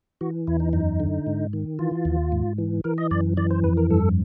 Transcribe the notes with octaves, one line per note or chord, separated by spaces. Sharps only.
E3 F#4
E2 E4
D#4
F#2 D#4
D3
G#2
D#3
E3 F4
D#2
G#2
E3
E3 A#4
D#5
F#2 D5
E3 D5
C5
F2 B4
A#4
G2 A4